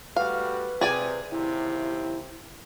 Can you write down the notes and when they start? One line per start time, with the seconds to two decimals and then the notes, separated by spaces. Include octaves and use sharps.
0.16 G3 A3 F#4 B4 F5
0.81 C3 G#4 D5 G#5
1.31 D#2 C3 E4